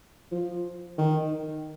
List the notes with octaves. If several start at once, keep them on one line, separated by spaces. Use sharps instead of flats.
F3
D#3